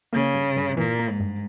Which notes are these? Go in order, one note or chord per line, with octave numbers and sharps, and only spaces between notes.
C#3 A#3
G2
G2
A#2 E3
A#3
G#2
G2